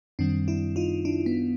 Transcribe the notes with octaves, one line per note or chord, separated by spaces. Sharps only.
F#2 D#3 G3 C4 D4
D4 E4
D#4 F4
D4 E4
B3